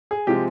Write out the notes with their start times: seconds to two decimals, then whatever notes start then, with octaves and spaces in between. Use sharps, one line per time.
0.11 G#4
0.27 C3 F3 G#3 G4